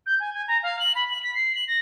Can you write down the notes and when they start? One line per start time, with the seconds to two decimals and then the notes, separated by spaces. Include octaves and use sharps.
0.06 G6
0.20 G#5
0.34 G#5
0.48 A#5
0.63 F5
0.79 F#7
0.95 B5
1.11 F#7
1.23 B6
1.35 C7
1.55 F#7
1.68 A#6